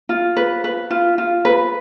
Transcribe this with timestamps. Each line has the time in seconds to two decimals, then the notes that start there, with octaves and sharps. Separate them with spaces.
0.09 F4
0.37 B4
0.64 B4
0.90 F4
1.18 F4
1.45 B4